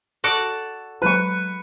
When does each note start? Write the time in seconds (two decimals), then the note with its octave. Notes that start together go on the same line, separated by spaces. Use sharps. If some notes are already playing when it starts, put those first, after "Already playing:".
0.24 F#4 A4 D5
1.02 F#3 G#3 B4 C#6